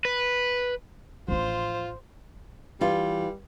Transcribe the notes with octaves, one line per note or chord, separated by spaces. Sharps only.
B4
A1 F3 D4 F4 C5
E3 G3 F4